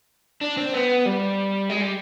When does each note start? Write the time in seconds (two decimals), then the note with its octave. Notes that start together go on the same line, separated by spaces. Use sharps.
0.41 D4
0.58 C4
0.74 B3
1.06 G3
1.70 G#3
1.81 G3